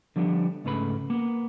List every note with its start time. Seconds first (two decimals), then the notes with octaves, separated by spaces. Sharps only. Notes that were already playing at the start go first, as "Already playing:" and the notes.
0.16 D3 F3 G3 A#3 B3 D4
0.64 C#2 G#2 C#3 A3 B4 B5
1.10 A#3 B3